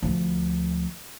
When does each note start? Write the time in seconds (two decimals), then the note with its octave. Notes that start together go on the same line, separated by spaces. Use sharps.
0.03 D2 F3